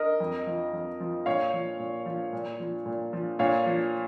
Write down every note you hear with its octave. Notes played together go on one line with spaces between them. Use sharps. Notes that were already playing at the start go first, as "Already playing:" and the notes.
Already playing: A#4 D#5
F2
F3
F2
F3
A#2 C#5 F5
F3
A#2
F3
A#2
F3
A#2
F3
A#2 C#5 F5
F3